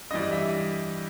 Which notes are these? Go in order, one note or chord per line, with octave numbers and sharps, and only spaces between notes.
G2 E3 G3 D#5
E5